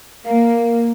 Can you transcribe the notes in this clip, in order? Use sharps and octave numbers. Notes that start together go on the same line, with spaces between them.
A#3 A#4 F5